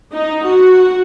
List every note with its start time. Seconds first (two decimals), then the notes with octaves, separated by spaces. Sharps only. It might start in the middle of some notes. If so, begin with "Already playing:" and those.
0.12 D#4
0.45 F#4